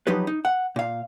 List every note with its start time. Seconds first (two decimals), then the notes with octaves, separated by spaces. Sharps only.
0.07 F3 F#3 D#4 G4 B4
0.27 D#4
0.45 F#5
0.76 A#2 F5